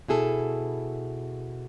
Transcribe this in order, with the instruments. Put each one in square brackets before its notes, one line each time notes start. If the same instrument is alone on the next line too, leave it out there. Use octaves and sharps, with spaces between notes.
[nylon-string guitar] B2 E4 G#4 A4